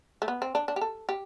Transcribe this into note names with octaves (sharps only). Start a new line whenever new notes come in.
A3
B3
C4
D4
D4
G4
A4
G4